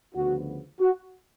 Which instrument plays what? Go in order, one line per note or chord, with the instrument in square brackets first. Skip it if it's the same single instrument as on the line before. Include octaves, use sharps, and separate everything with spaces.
[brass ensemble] D2 C#3 F3 B3 F#4
F#4